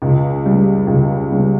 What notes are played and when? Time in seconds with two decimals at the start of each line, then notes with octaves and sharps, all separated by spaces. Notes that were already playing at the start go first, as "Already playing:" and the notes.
0.02 C#2
0.44 C#3 G3
0.87 C#2
1.31 C#3 G3